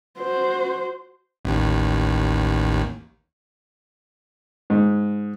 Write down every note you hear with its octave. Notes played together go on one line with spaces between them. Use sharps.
F#4 C5
A1 D#2
G#2